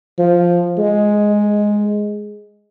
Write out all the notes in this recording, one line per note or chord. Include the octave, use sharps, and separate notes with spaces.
F3
G#3